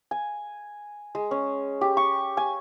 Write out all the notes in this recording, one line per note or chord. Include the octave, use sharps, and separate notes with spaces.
G#5
G#3
C#4
G4
C#6
G#5